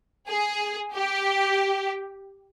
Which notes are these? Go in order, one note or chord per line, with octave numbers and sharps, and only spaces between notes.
G#4
G4